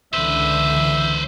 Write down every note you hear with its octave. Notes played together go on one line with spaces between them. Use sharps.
C#2 D3 E3 B4 C5 E5